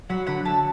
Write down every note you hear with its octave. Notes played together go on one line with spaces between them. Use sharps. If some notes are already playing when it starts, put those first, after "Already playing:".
F#3 F#5 B5
D3 F#5 B5
F#3 E5 A5